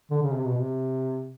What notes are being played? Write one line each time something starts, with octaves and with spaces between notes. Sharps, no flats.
D3
C#3
C3
B2
C3